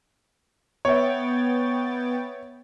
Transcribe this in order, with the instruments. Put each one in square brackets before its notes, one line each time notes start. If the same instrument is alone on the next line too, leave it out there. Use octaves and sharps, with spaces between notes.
[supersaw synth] B3 G5 A6 [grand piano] C#5 E5